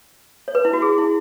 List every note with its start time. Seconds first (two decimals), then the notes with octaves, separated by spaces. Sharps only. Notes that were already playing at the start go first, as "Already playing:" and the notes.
0.48 C#5
0.55 B4
0.65 E4
0.73 F#4
0.82 G#4
0.98 E4